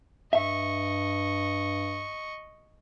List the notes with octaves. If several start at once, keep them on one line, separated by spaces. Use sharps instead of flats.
G2 D#5 E5 C#6